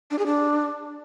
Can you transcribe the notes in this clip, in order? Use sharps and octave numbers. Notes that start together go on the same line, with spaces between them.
D4
G#4
D4